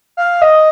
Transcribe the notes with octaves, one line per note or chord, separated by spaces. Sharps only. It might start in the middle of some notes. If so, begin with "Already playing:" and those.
F5
D#5